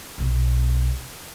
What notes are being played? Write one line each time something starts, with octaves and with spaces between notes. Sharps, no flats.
B1 B2